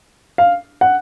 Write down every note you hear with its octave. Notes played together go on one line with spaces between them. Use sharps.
F5
F#5